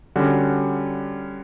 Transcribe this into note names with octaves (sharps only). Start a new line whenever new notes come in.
D3 G3 C#4 F#4